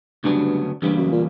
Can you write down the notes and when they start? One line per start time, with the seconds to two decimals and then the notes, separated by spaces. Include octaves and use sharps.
0.24 D2 G2 C#3 F#3 B3 D4
0.82 E2 G2 C#3 E3 G3 A#3
0.97 F#2
1.12 A#2